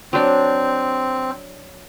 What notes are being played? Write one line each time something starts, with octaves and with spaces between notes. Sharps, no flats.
F#3 C4 D4